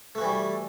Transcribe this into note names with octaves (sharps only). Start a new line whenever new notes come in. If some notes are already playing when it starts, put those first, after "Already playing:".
E3 G3 A3 F#4